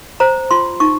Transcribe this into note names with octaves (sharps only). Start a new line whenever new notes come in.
C5 A#5
F4 C6
D#4 C#6